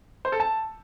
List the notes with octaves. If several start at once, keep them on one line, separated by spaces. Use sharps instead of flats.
C5
A4
A5